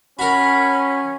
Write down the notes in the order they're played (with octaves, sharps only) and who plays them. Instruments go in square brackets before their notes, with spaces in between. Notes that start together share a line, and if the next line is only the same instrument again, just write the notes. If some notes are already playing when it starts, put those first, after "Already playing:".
[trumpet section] C#4 [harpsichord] F#4 A#4 [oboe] B5